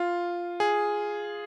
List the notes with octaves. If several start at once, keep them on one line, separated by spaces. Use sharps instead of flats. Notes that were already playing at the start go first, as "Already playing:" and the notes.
Already playing: F4
G#4